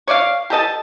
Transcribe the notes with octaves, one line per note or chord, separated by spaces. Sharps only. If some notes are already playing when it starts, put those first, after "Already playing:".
C#5 D5 E5 F5
G4 A4 D#5 A5